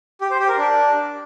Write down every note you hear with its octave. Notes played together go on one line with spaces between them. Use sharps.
G4
C5
G4
A#4
D4